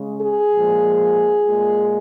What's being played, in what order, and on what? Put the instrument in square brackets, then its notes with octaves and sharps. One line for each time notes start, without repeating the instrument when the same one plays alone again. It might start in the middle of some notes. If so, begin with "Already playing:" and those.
Already playing: [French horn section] C#3 G#3
G#4
A#2 F3 G#3
A#2 G#3